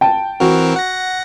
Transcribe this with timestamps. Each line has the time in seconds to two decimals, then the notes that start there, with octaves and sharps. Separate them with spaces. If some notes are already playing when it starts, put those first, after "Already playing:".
0.01 G5 A5
0.40 E3 C4 F#4 A#4
0.76 F#5 A#6